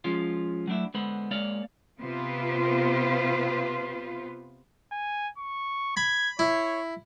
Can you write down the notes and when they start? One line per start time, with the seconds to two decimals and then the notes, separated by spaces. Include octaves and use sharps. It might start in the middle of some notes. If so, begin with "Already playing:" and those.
0.04 F3 G#3 C#4 F4
0.67 F#3 A3 D4 E4
0.94 D3 G#3 B3 C5 B5
1.31 G#3 A#3 C#5 D5 F5
2.00 C3 B3 F4 B4 C5
4.92 G#5
5.38 C#6
5.97 B5 G#6
6.39 E4 C#5